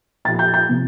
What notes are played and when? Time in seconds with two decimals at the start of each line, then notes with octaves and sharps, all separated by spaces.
0.25 A#2 F3 A6
0.39 G6
0.54 G6
0.69 C3 F3